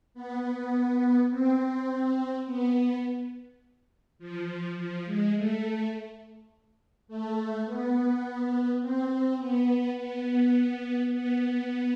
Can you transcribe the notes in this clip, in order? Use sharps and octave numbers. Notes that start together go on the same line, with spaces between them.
B3
C4
B3
F3
F3
G#3
A3
A3
B3
C4
B3
B3
B3